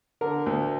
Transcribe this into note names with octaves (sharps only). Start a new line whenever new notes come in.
D3 A#4
D2